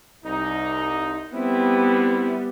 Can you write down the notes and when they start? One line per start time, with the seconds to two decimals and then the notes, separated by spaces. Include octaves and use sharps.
0.24 C2 D#4
1.34 G3 B3 C4 E4